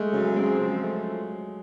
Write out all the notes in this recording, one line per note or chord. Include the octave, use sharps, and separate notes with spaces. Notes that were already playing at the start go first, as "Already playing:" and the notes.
Already playing: G#3 A3
C#3 F#3
G#3 C4
F3
A3